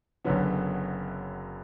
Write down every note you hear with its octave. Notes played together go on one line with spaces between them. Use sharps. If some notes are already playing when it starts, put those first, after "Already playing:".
F#1 F#2 D3 F#3 B3